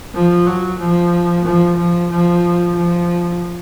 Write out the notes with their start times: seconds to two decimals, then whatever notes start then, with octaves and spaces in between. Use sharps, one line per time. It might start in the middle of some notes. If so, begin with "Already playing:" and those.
0.14 F3
0.46 F#3
0.79 F3
1.45 F3
1.77 F3
2.11 F3
2.75 F3